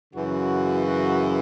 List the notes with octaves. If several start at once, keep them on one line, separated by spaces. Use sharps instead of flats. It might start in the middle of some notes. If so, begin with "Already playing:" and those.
F#2 C#3 E3 F#4
F#4